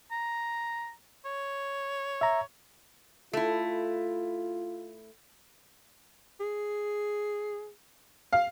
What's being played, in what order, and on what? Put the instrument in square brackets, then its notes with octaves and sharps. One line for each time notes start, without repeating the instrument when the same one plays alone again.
[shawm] A#5
C#5
[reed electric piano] E5 A#5
[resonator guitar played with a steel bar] A3 E4 [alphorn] F4
[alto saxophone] G#4
[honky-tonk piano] F5